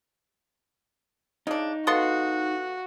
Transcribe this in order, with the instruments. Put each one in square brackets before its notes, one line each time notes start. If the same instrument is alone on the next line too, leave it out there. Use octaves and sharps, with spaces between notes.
[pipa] C#3 D4 [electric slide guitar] D#4
[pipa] B3 A4 C6 [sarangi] F#4 [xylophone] F5 D#6